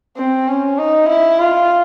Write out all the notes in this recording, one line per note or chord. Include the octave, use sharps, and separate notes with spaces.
C4
C#4
D#4
E4
F4